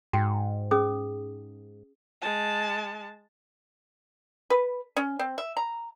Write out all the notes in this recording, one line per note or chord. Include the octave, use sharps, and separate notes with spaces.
G#2 F#4 G5
C#4 G#4 D#6
G#3 A5
B4
C#4
C4
E5
A#5